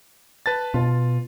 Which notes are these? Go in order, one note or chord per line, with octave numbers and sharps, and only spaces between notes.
B4 A5 A6
B2 F4